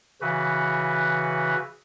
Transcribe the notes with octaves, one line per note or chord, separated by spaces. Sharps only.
C#3 E3 F#4 B4